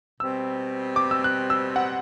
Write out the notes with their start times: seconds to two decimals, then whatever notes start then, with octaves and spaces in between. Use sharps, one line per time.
0.20 B2 G3 C4 E6
0.96 D6
1.11 E6
1.24 F#6
1.50 E6
1.76 F#5